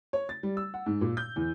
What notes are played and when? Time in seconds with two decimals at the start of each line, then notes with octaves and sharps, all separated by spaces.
0.13 C#5
0.29 A6
0.43 G3
0.57 E6
0.74 F#5
0.86 G#2
1.01 A#2
1.17 G6
1.36 E2